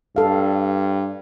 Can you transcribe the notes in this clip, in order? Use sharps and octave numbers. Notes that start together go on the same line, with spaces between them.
G2 A4 F5